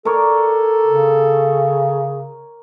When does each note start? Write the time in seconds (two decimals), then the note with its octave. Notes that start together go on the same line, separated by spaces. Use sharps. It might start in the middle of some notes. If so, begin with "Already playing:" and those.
0.05 A4 A#4 C#5 D5
0.87 C#3